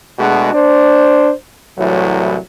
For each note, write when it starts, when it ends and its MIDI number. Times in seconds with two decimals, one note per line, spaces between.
0.19 0.52 47
0.19 0.52 56
0.19 0.52 57
0.19 0.52 62
0.19 0.52 66
0.19 0.52 68
0.54 1.32 62
0.54 1.32 72
1.78 2.37 36
1.78 2.37 45
1.78 2.37 52
1.78 2.37 54